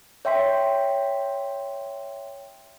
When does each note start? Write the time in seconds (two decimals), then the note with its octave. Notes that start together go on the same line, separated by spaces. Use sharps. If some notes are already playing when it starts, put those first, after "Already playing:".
0.25 C#5 E5 G5 C6 B6